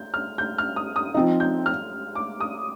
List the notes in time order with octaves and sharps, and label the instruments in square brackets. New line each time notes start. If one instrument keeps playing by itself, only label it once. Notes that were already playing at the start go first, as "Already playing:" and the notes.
Already playing: [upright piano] G6
F6
G6
F6
D#6
D#6
[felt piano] F3 C4 D#4
[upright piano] G6
F6
D6
D#6